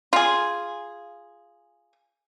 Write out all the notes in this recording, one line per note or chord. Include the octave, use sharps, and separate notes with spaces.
F4 G#4